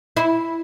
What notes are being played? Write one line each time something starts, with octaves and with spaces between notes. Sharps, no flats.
E4